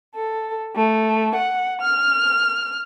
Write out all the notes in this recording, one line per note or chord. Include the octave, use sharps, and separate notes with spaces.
A4
A3
F#5
F6